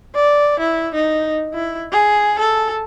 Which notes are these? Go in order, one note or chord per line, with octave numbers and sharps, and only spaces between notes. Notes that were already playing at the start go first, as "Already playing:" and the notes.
D5
E4
D#4
E4
G#4
A4